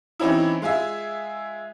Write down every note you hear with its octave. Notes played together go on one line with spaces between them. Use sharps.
E3 C4 C#4 D#4 E4
G#3 F4 G#4 E5